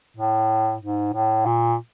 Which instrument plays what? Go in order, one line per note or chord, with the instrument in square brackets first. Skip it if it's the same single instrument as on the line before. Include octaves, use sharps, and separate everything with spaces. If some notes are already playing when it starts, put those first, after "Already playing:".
[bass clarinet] A2
G#2
A2
A#2